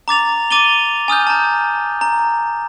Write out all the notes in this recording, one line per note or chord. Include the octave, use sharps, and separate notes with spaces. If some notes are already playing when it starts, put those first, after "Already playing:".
A#5 D6 A6 F7
D6 A6 D#7 F7 G7
G#5 D#6 F6 G6
A5 A#5
A#5